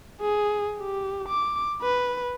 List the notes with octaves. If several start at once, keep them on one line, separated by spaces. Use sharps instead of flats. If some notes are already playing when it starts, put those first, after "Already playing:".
G#4
G4
D6
B4